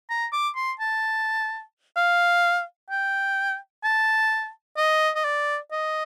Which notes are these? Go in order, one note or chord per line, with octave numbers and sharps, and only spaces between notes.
A#5
D6
C6
A5
F5
G5
A5
D#5
D#5
D5
D#5